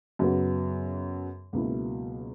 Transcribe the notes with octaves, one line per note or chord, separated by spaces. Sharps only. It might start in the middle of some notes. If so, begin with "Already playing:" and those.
F#2 C#3 F#3 B3 F#4
C#2 B2 F#3 A#3 E4